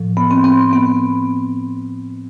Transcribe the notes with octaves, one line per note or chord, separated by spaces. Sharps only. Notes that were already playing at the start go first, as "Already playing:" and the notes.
Already playing: A2 F3
B3
C4
C4
B3